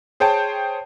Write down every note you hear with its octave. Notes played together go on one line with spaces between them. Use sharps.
G#4 C5 C#5 G5 A5